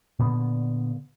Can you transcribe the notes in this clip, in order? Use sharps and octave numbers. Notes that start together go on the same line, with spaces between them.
A#2 D3 B3